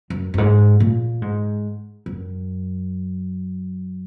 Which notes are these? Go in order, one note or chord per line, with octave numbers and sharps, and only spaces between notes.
F#2
F#2
G#2
A#2
G#2
F#2